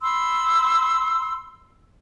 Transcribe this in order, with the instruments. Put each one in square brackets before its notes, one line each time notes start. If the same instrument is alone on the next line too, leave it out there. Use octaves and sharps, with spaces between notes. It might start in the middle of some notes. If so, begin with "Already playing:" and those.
[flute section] B5 C6 E6